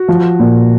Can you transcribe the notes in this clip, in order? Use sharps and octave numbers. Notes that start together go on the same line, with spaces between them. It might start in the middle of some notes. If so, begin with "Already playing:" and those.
Already playing: F#4
F3
A#2